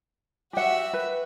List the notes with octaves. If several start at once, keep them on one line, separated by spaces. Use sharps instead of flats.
F#4 G4 E5 F#5
B4